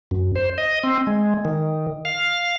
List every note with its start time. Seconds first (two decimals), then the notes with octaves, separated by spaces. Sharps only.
0.11 F#2
0.35 C5
0.58 D#5
0.83 C4
1.07 G#3
1.45 D#3
2.05 F5